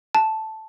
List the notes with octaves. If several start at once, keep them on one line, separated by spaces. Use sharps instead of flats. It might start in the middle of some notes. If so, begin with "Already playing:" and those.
A5